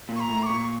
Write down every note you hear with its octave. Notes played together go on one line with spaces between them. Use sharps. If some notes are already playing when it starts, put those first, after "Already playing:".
A#2
C#6
A#5
A2
D6
A#2 C#6